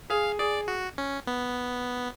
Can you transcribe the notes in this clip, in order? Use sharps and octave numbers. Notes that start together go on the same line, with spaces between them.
G#4 F5
G#4 D5
F#4
C#4
B3